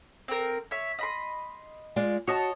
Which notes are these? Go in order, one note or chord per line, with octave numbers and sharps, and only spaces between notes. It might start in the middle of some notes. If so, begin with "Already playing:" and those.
C4 A#4
C#5 E5
D#5 B5 C6
G#3 F4 D5
F#4 C#5 D#5 A5